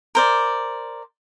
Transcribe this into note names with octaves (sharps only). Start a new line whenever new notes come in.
A#4 C5 D5